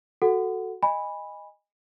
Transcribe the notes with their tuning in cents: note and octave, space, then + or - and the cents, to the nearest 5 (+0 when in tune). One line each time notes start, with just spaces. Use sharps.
F#4 +0 A4 +0 F#5 +0
D#5 -5 G#5 -25 B5 -5